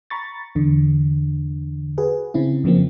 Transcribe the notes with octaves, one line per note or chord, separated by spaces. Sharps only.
A#5 B5 C#6 A6
E2 D3
F#4 G#4 B4
C#3 C4 E4
F2 C#3 F3 A#3 C4